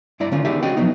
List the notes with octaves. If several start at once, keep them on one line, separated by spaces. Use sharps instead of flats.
G2 E4 D5 A#5
D3 D#3 C#4 F4
E2 D#4 G4 G#4 E5
C#4 F#4 D#5 G5
F3 F#3 B3 D#4